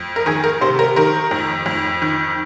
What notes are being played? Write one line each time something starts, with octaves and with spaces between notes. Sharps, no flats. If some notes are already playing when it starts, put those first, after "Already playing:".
Already playing: F2
A#4
D#3 G#4
A#4
C3 C5
A#4
D#3 A#4
F2
F2
D#3